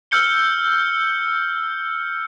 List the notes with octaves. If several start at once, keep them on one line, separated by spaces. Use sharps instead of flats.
E6 F6 G6 C#7 G7